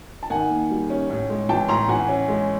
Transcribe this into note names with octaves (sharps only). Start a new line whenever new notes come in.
A5
D#3 F#5 G#5
A#3
G3
C#4
A2
G#3
E3 G5 A5
A2 A#5 C6
E3 F#5 G#5
C#4
G#3